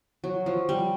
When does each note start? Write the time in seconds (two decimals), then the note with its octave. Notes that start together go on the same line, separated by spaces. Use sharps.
0.24 F#3
0.46 F3
0.69 G3